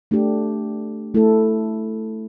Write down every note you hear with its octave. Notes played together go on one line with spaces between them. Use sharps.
A3 D4 G4
A3 E4 A4